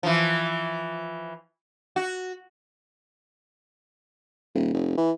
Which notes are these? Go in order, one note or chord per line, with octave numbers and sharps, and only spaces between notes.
E3 F3
F#4
D#1
F1
E3